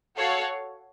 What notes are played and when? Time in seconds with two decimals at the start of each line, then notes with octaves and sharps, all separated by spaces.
0.17 F#4 A4 C#5 F5